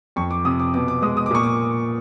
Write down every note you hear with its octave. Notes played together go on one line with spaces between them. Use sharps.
F2 C#6
D6
C3 D#6
D6
B2 D6
D6
G#3 D#6
D#6
D6
A#2 C#6
D6